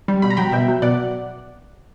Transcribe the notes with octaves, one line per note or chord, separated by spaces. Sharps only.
G3
B2 B5
A#5
F#3 G5 B5
B2 E5 G5
F#3
B2 D5 F#5